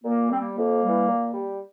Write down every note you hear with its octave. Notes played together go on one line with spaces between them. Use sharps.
A#2 A#3
G3 C4
A#3
F2 A#3
E3 G3
A#2
G3